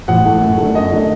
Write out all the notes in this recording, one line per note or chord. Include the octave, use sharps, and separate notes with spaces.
A1 F#5
A2 A3
F#2
D3 A3
F#2 D#5
D3 A3